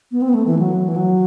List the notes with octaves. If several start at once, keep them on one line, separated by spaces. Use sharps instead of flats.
B3
C4
B3
A3
E3
F#3
E3
F#3